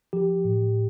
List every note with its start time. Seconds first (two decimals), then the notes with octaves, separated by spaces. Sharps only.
0.13 F3 G4
0.45 A2